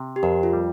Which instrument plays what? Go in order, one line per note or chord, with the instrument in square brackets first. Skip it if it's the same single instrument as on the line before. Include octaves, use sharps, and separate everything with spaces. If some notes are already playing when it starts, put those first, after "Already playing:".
Already playing: [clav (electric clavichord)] C3
[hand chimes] G4
[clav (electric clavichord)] F2 [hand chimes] A#4
[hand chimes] F4
[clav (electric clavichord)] G3